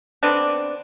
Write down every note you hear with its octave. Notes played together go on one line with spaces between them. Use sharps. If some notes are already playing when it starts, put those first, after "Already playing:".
D3 B3 C4 D4